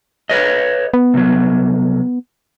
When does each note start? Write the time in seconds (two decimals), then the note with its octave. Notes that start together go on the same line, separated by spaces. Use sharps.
0.29 B4 C#5 D#5
0.94 B3
1.14 C2 F#3